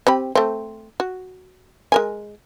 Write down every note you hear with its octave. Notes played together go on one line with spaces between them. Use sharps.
C4 G4 B5
A3 C4
F#4
G#3 A#4 G#5